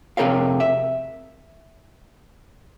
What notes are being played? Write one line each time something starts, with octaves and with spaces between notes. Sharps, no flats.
F2 C3 G#4 A#4 C#5 F5
E5